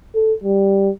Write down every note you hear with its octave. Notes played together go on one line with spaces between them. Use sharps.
A4
G3